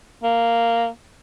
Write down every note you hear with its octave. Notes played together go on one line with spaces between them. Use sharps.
A#3